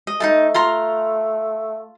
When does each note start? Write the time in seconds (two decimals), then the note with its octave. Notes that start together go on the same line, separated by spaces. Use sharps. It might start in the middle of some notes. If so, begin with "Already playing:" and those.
0.07 D#5
0.20 A3 D#4 F4 A5
0.54 F4 A#5 C6